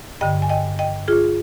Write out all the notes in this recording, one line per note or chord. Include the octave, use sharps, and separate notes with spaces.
G2 D3 D#5 G5
G#5
D#5 G5
D#5 G5
F4 G#4